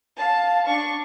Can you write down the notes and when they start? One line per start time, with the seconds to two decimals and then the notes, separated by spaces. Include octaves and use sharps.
0.17 F5 A5
0.67 D4 C#6